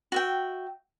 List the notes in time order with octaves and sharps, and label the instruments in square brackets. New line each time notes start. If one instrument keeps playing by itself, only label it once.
[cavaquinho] F#4 E5 G5